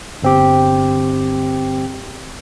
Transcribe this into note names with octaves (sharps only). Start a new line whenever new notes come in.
G1 C4 G4